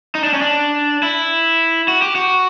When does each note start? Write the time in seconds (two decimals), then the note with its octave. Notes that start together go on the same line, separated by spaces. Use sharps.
0.15 D#4
0.24 D4
0.34 C#4
0.42 D4
1.03 E4
1.88 F#4
2.02 G4
2.15 F#4